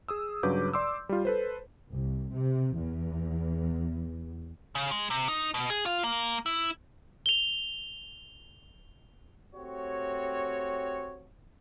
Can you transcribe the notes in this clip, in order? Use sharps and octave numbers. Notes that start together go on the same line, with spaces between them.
G#4 D#6 E6
G2 C#3 F#3 B4 D6 G6
D5 C6 D6 E6
G3 F4
A4 B4 C5
C2
C3
E2
C#3
G#3
C3
D#4
B2
G#4
F4
A#3
E4
F7 G7
A3 C4 F#4 G4 C#5